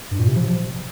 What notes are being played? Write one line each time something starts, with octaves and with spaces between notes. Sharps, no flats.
G2
A#2
C3
F3